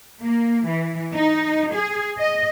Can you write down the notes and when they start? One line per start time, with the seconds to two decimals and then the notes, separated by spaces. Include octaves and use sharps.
0.23 A#3
0.68 E3
1.15 D#4
1.75 G#4
2.20 D#5